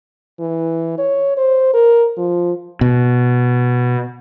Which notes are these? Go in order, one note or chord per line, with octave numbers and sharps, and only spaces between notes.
E3
C#5
C5
A#4
F3
B2